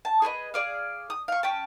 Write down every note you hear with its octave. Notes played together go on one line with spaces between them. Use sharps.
A5
G#4 B4 C5 D#5
G#4 D5 F5
D#6
F5 C#6
C#4 G5 A5